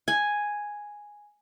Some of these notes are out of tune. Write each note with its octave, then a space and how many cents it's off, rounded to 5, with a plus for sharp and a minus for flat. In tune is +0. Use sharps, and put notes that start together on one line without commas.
G#5 +0